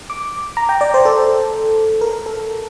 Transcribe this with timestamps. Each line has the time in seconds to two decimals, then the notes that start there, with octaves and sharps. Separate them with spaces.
0.10 D6
0.57 A#5
0.69 G5
0.81 D5
0.94 C5
1.05 A4
2.01 A#4
2.26 A4